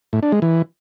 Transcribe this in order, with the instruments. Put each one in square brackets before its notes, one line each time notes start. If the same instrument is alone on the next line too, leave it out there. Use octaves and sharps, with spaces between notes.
[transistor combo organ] A2
D4
G#3
E3